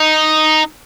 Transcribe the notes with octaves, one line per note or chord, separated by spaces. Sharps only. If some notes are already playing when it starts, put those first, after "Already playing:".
Already playing: D#4